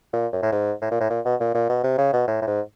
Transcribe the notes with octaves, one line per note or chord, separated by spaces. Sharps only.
A#2
F#2
A2
G#2
A2
A#2
A2
A#2
B2
A#2
A#2
B2
C3
C#3
B2
A2
A2
G#2